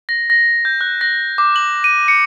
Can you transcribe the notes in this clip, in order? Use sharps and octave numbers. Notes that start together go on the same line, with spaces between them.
A#6
A#6
G6
F#6
A#6
D6
F#7
D#7
C#7